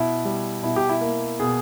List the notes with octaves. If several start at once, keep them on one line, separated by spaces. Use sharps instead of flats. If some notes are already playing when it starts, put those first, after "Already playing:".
Already playing: B2 E4
G3
B2 E4
G4
E4
A#3
B2 G#4